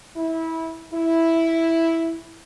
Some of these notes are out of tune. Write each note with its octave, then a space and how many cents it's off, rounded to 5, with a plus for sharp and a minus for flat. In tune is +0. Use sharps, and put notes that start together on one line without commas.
E4 -20
E4 +0